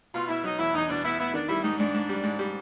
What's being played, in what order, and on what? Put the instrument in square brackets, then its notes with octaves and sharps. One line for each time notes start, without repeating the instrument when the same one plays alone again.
[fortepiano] B2 [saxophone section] F4
[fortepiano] B2 [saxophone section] E4
[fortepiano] F#3 [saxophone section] D#4
[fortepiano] E2 [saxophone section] E4
[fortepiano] E2 [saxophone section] D#4
[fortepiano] B2 [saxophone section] D4
[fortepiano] B3 [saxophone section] E4
[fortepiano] B3 [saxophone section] E4
[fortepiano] D#3 [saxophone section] D4
[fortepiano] G3 [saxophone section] E4
[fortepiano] G#2 [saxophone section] D#4
[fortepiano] G#2 [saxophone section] D4
[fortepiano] G#2
G3
G#2
G3